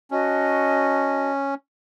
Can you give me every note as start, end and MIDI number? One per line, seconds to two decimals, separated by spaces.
0.11 1.54 61
0.11 1.30 66
0.11 1.30 75
0.11 1.30 81